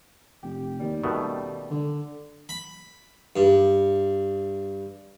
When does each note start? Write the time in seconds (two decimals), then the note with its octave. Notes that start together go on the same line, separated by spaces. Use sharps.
0.43 F1 G4
0.80 D#2 G3
1.04 D#1 B2 D#3 A3
1.70 D3
2.49 B5
3.36 G2